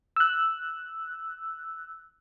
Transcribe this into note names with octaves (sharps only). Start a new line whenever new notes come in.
E6 F#6